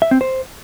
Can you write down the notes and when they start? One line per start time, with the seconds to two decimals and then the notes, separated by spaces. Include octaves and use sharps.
0.02 E5
0.11 C4
0.21 C5